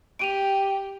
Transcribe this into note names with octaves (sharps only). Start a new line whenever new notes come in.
G4 D7 D#7 F7